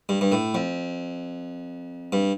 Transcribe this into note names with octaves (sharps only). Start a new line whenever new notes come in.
G2
G2
A2
F2
G2